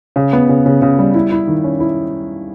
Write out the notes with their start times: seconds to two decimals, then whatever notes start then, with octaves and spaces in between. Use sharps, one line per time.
0.16 C#3
0.33 B3
0.49 C#3
0.66 C#3
0.82 C#3
0.99 G3
1.14 E4
1.32 E4
1.48 D#3
1.64 C#4
1.80 E4